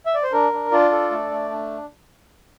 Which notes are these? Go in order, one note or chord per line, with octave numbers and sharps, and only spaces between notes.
E5
D5
C5
D4 A#4
D4
D4 F4 D5
A4
A3
A3
D4